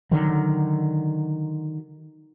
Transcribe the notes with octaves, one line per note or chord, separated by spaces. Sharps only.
D3 D#3 F#3